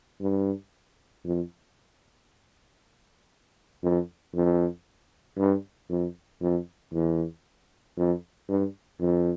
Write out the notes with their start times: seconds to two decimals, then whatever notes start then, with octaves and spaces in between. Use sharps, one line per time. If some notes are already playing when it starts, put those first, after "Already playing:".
0.21 G2
1.25 F2
3.83 F2
4.35 F2
5.38 G2
5.90 F2
6.42 F2
6.93 E2
7.97 F2
8.49 G2
9.01 F2